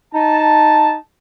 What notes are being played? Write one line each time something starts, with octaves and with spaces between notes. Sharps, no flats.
D#4 A5